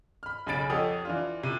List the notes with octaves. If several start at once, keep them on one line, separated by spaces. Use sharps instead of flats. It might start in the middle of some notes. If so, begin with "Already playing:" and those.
B5 F6
B1 C#3 G#5 B5 A6 D7
F2 G4 A4 C#5 F#5 D#6
E3 D4 F4
C3